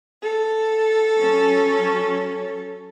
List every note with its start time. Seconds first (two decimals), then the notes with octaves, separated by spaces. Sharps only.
0.22 A4
1.18 F#3 C#4